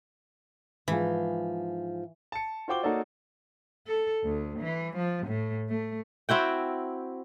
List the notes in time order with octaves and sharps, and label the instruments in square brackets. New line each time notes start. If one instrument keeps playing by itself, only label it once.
[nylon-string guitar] G#2 F3 [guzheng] E3
[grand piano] A5 C#7
F4 F#4 C5 G5 D6 G7
A#3 D#4 F#4 A4 C#5 D5
[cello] A4
D2
E3
F3
A2
A3
[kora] C4 E4 F#4 G5